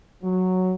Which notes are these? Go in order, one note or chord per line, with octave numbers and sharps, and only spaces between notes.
F#3